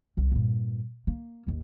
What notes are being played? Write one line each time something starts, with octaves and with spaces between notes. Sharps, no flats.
C2 F#2
G2 A#2
A#3
A1 D#2